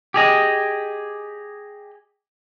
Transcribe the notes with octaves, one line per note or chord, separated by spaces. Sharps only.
G4 G#4 D#5